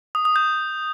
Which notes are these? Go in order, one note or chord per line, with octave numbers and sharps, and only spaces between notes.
D#6
D#6
G6